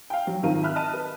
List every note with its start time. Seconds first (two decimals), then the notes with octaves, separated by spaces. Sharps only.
0.10 F5 G5
0.27 F#3
0.43 G#1 D#3 F3 F5 A#5 D#7
0.63 E5 B5 F6 F#6
0.76 D#5 A5 F6 D#7
0.93 B4